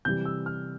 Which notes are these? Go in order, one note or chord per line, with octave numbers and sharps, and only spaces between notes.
C3 E3 G3 G6
E6
F6